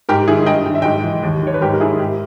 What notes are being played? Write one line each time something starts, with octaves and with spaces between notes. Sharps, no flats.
G#2 G4 A#4
D#3 E4 G#4
G2 D#5 G5
D#3 G5
E5
G#2 D#5 G5
E3
D#2
D#3 C#5
B4
G#2 G4 A#4
A#4
D#3 E4 G#4
G#2 G4